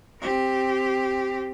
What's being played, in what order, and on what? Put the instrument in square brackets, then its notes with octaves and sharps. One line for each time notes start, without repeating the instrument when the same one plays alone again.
[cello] C4 G4